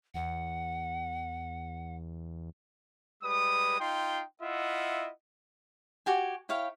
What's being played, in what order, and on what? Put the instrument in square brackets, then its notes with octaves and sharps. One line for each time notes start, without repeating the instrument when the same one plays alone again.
[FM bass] E2 [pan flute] F#5
[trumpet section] G3 G#3 B4 D#6
D#4 F4 G5 C6
E4 F4 D#5 E5 F#5
[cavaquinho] F#4 G4 G#5
E4 C#5 F5 G5